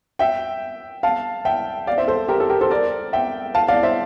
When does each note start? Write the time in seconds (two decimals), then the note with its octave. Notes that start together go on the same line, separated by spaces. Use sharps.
0.19 E5 G5
1.03 F5 A5
1.45 E5 G5
1.87 D5 F5
1.98 C5 E5
2.08 A4 C5
2.28 G4 A#4
2.40 A4
2.50 G4 A#4
2.61 A4 C5
2.71 A#4 D5
3.13 E5 G5
3.55 F5 A5
3.68 D5 F5
3.83 C5 E5